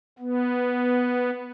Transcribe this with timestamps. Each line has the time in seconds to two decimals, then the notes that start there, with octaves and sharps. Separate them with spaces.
0.19 B3